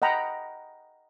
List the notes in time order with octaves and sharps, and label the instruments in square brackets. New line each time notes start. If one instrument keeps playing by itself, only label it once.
[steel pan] D#5 F#5 G5 A#5 B5